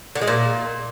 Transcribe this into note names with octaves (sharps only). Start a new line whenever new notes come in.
D3
G#3
A#2